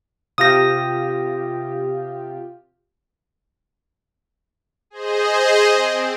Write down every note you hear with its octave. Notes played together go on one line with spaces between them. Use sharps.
C3 F4 G4 D#6 A#6
G#4 C5 D#5
C4